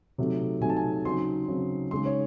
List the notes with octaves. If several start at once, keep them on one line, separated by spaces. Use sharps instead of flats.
C3 F#3 A3 D#4
C3 F#3 A3 D#4 G#5
A5
G#5
C#3 F#3 C4 D#4 C6
C#3 F#3 C4 D#4
C#3 G#3 D#4 C6
C#5